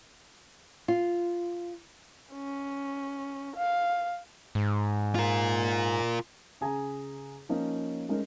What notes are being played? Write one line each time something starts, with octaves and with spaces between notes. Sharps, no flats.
F4
C#4
F5
G#2
F4 A#4
C#3 G#4 G#5 A#5
F3 A#3 C#4 D#4
G#3 A3 C#4 D#4 A#4